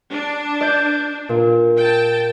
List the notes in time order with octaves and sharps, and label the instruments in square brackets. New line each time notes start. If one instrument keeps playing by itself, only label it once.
[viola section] D4
[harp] D5 G6
A#2
[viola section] G5 A5